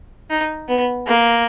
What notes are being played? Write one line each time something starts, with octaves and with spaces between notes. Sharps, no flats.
D#4
B3
A#3